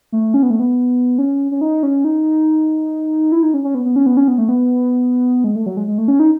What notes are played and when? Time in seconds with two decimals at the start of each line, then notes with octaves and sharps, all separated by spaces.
0.12 A3
0.34 C#4
0.43 B3
0.50 A3
0.59 B3
1.18 C#4
1.51 C#4
1.61 D#4
1.83 C#4
2.04 D#4
3.32 E4
3.43 D#4
3.54 C#4
3.64 C#4
3.75 B3
3.85 B3
3.96 C#4
4.06 B3
4.17 C#4
4.28 B3
4.38 A3
4.49 B3
5.44 G#3
5.56 A3
5.66 F#3
5.77 G#3
5.88 G#3
5.98 A3
6.08 C#4
6.20 D#4